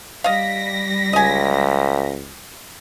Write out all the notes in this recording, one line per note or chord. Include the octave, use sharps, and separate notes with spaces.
G3 D#5 F5 A#6 B6
C#2 D#5 G#5